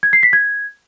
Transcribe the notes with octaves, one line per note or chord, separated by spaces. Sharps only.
G#6
C7
B6
G#6